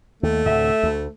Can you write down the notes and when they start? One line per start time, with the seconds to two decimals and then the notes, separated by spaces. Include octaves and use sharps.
0.23 D#2 A3
0.46 D2 A2 C3 E5
0.83 D2